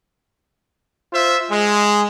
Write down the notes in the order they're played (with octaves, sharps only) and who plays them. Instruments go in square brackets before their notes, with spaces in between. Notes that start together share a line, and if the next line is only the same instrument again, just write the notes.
[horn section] F4 C5 E5
G#3